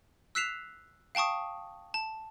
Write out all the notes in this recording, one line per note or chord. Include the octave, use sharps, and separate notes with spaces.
E6 F#6 B6 C7 E7 F7
F5 G5 A5 C#6 D#6
A5